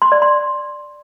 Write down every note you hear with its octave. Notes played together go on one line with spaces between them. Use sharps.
C6
D5
C6